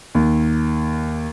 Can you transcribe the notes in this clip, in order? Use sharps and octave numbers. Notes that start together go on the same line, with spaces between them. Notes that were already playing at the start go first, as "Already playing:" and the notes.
D#2